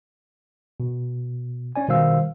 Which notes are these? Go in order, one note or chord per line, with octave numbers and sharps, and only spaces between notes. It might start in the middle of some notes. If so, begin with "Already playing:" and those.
B2
C#4 D5 G#5
B2 D#3 G3 C5 F5 E6